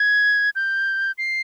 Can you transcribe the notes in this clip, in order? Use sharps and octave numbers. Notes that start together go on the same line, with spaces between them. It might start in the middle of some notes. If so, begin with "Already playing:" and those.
Already playing: G#6
G6
C7